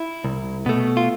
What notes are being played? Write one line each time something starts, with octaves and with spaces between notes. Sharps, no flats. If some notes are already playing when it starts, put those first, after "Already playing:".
Already playing: E4
C2
B2 A3
F4